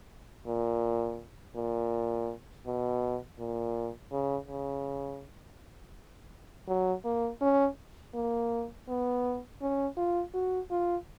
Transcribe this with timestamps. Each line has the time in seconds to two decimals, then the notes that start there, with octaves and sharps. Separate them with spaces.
0.46 A#2
1.56 A#2
2.66 B2
3.39 A#2
4.12 C#3
4.48 C#3
6.68 F#3
7.05 A#3
7.41 C#4
8.15 A#3
8.88 B3
9.62 C#4
9.97 F4
10.34 F#4
10.71 F4